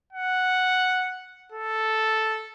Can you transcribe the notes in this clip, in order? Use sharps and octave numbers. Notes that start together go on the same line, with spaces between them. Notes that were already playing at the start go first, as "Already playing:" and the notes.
F#5
A4